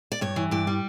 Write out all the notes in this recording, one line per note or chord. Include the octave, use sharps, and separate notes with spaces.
D5
G2 C#5
E3
G2 D5
G3